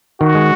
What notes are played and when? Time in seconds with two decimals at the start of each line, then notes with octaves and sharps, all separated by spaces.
0.20 D#3 F#4
0.35 G#3